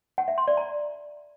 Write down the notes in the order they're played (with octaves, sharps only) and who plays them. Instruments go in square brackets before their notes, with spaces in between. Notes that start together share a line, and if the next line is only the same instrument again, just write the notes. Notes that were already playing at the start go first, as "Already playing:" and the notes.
[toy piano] F#5
E5
C6
D5
A#5